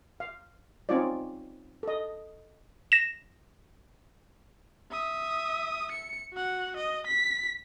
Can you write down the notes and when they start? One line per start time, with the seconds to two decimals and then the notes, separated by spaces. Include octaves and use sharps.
0.20 F5
0.89 C4 C#4 D#4 F4 C#5 D5
1.83 A4 D#5
2.92 A#6 E7
4.92 E5 D#6
5.92 C#7
6.34 F#4 F#5
6.76 D#5
7.07 B6